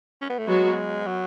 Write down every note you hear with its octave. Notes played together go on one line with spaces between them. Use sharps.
C#4
B3
A3
F#3 G#3 B3 F#4
F#3